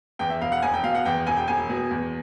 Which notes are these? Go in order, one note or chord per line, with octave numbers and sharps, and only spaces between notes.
E2 G5
E5
E1 F5
F#5
E1 G#5
G5
B2 F5
F#5
E2 G5
E1 G#5
G5
E1 G#5
B2
E2